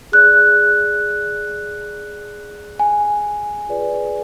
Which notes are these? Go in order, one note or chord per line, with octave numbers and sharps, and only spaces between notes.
G#4 D5 F#6
G#5
F4 G#4 B4 D5